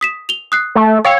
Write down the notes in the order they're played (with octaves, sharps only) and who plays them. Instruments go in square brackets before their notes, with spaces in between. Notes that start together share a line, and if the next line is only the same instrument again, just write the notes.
[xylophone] D#6 B6 E7
F7 G7
D#6 F#6 C7
[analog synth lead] A3
[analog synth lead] C#5 [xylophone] F5 G5 E6